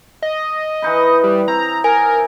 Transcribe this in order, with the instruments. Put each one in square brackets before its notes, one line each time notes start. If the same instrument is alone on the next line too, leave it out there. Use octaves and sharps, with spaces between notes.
[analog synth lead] D#5
[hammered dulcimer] E3 D#4 B4
[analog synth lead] G3
[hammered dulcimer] C4 [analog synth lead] A#5
[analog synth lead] A#4 [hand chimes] G#5